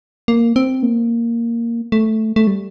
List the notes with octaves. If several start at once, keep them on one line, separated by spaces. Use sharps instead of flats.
A#3
C4
A#3
A3
A3
G3